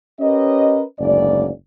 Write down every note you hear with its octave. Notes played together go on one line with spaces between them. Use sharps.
C#4 G4 A#4 B4 C#5 D#5
F#1 D2 G#2 C#4 D5